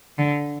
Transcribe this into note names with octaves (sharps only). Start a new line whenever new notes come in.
D3